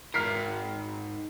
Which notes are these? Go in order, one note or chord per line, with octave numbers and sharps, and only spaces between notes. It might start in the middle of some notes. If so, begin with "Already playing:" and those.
G#2 A#4 F6 B6 C7